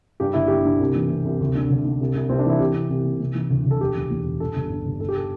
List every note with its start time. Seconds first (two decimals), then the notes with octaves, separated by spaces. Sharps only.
0.20 G2 G4
0.34 G1 E4
0.48 D3 G4
0.65 D3
0.80 C2
0.96 E3
1.10 C3
1.25 C2
1.41 D2
1.55 D3
1.70 D2
1.85 D3
2.01 C2
2.15 C2
2.30 C2 C4
2.39 D4
2.46 E3 E4
2.60 C2 G4
2.75 C2
2.90 C2
3.05 C3
3.20 C3
3.35 E3
3.50 D2
3.66 D2
3.71 A4
3.81 E1 G4
3.96 E1
4.10 E2
4.25 E1
4.40 G2 A4
4.55 G1
4.70 G2
4.85 G1
5.00 D3 A4
5.09 G4
5.17 A4